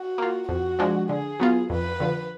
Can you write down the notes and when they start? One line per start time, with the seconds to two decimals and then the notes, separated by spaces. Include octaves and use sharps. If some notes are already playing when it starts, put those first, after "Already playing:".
Already playing: F#4
0.18 A#3 F4
0.49 F2 F#4
0.79 F3 G#3 D4
1.09 D3 G#4
1.40 F#3 B3 F4
1.70 F2 B4
2.00 D3 F3